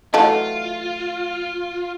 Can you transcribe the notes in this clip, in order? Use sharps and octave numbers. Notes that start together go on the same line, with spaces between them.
E3 F#3 A3 F4 D#5 F5 A5